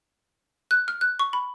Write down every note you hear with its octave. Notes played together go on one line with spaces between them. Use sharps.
F#6
F6
F#6
C#6
B5